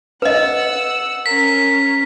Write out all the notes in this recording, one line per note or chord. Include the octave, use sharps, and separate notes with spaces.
B4 D#5 F#5 E6
C#4 A#4 B6